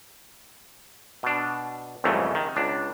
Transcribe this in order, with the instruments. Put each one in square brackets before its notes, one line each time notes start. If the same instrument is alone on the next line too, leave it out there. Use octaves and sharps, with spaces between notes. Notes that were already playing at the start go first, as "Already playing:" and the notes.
[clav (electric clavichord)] B2 D4
C2 F2 G#2 C#3 E3 A3
D#3
C#2 D4